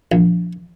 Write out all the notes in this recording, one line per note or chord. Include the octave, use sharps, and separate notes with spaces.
A#1